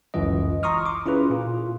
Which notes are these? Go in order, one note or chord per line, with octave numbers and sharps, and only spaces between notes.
G1 C#2 F#2 E3 F4 D#5
A#5 C6 C#6 D#6 F6
C6 D6
C#4 E4 F4 G#4 B4
A#2 F4